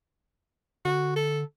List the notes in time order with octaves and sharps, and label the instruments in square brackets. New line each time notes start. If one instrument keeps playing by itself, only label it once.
[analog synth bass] D3 [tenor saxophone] F#4
[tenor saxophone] A4